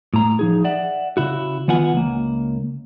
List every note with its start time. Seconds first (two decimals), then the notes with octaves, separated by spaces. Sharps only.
0.14 A2 A#5
0.39 F3 D#4 G#4
0.64 D5 E5 F#5
1.17 C#3 E4 F#4
1.68 D#3 E3 B3 F4 F#5 G#5
1.93 C#2 A#3